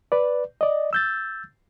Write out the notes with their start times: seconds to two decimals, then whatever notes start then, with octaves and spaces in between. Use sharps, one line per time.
0.12 B4 D5
0.61 D5 D#5
0.93 E6 G6 A6